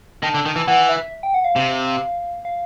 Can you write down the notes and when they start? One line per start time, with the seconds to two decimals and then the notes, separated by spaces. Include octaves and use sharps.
0.23 D#3 A5
0.34 D3
0.46 D#3
0.56 E3
0.68 E3 F#5
0.89 E5
1.23 G5
1.34 F#5
1.45 F5
1.56 C3
2.45 F5